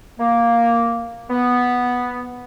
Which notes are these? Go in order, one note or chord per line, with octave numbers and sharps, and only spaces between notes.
A#3
B3